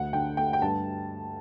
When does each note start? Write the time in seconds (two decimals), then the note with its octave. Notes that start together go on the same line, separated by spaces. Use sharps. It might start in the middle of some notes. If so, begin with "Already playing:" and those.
Already playing: D2 F#5
0.13 D3 G5
0.37 A3 G5
0.53 G5
0.62 G2 A5